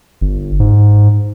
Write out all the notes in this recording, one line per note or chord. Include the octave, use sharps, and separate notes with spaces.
G1
G#2